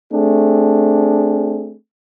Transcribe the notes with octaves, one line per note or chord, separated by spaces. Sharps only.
A3 C4 D4 G#4